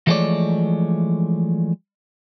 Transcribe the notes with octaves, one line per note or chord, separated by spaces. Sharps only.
E3 F3 G#3 A3 C#5 D5